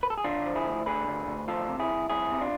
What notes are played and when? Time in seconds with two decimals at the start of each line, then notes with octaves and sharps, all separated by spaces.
0.03 B4
0.10 A4
0.18 G#4
0.24 D3 D4 F4
0.46 F3
0.56 E4 G#4
0.66 D2
0.86 D3 G#4 B4
1.07 D2
1.27 D2
1.48 F3 F4 A4
1.68 C3
1.79 E4 G#4
1.90 C2
2.10 C2 E4 G#4
2.31 C3
2.41 D4 F4